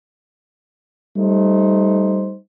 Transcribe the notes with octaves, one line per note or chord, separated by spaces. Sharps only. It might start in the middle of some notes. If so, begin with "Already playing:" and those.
G3 A3 D#4 C5